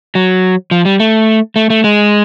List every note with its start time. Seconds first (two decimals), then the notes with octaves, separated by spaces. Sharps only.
0.15 F#3
0.71 F3
0.85 G3
1.00 A3
1.56 A3
1.70 A3
1.84 G#3